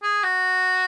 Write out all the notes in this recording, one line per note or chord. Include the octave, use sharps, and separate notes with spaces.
G#4
F#4